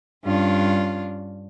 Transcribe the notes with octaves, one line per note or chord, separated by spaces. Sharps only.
G2 C#4 D4 F4